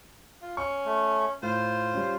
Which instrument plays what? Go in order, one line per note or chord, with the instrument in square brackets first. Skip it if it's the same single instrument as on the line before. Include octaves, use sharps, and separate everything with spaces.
[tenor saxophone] F4
[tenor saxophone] C#4 [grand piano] C#6
[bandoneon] A3
[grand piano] A2 [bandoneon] F4 [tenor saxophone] C5
[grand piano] G3 C#4